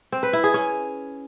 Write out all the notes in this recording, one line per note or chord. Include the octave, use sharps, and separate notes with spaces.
C4
B4
E4
G#4
C#4